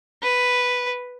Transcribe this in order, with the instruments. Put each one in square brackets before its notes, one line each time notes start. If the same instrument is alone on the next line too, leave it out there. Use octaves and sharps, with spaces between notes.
[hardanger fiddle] B4